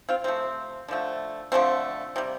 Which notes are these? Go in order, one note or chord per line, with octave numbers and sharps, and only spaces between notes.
C4 F4
C3 F3 A3 C4
D3 F3 A3
D3 F3 A3 C4
C3 G3